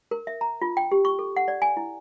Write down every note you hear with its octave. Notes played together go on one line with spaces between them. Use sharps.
A#4
E5
A#5
F4
G5
G4
C#6
A4
F#5
D5
G#5
E4